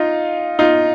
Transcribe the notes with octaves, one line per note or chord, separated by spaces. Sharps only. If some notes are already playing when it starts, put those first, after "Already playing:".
Already playing: D#4 F4
D#4 F4